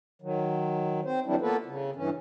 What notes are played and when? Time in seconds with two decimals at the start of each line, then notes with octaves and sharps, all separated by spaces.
0.22 D#3 F#3
1.05 C4 C5
1.26 E3 F#3 G3 C4 D4 E4
1.41 A#3 B3 F4 A4 B4
1.66 C#3
1.96 G2 E3 C#4